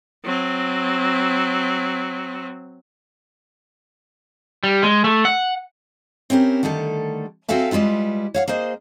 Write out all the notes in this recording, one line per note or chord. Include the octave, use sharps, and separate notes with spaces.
F#3 C4
G3
G#3
A3
F#5
C4 C#4 E4 G4 A#4
D3 D#3 G3 A3 A4
C4 F#4 A4 E5 F5 G#5
G3 G#3 E4 F4 B4
C#5 F5 F#5
A#3 G#4 C5 D#5